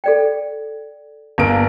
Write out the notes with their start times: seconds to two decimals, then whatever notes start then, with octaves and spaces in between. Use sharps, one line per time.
0.04 A4 D5 G5
1.38 G1 A#3 D7